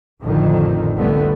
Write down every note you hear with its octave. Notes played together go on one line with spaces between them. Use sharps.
A1 F2 D3 D#3
F1 C2 D3 G3 A3 B3